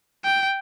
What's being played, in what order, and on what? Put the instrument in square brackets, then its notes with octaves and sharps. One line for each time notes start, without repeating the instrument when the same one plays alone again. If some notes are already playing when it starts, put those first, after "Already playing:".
[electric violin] G5